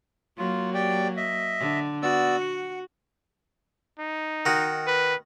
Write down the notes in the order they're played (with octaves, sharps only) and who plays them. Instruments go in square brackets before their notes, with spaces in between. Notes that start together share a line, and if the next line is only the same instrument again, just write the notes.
[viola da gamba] F#3 A#3 [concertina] F4
[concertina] G4 D5 G5
D#5 E5
[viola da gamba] D3
[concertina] B3 D5 E6 [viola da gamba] F#4
[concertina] F#5
[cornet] D#4
[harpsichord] D#3 F#4
[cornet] B4